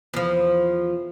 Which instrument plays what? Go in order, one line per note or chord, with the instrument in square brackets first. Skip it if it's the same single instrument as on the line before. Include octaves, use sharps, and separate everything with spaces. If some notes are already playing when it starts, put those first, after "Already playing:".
[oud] E2 F3